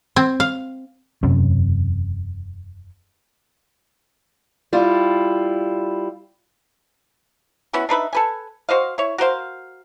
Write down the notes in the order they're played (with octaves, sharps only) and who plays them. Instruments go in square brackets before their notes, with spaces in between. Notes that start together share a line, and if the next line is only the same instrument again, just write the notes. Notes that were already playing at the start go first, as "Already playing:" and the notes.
[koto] C4
F5
[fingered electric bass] E1 F#2 C3 C#4
[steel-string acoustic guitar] G3 E4 F4
[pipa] B3 C#4 E4 F#4
D4 D#4 B4 E5
A4 B4 G#5
F#4 C5 D#5 F5
E4 C#5
F#4 A#4 C5 F5